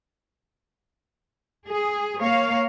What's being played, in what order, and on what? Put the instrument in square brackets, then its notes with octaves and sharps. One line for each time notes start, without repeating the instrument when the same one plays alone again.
[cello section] G#4
A#3 C#5 F5